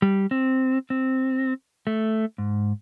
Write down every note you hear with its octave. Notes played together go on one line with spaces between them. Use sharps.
G3
C4
C4
A3
G#2